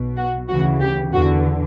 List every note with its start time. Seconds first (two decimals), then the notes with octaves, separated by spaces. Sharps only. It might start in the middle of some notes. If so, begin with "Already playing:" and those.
Already playing: B1 B2
0.17 F#4
0.48 D2 C#3 E3 F#4
0.80 G4
1.12 E2 D3 F#4